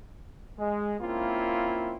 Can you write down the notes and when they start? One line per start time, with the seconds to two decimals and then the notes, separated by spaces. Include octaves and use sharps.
0.59 G#3
1.01 A#3 C4 C#4 E4 F4